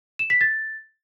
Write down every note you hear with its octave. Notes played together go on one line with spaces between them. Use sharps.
E7
B6
A6